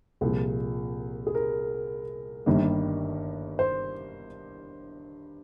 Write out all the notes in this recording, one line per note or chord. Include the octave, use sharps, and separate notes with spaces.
C2 A#2 F3 G#4
G#4
A#4
G1 G2 D#3 G3 A#3
C5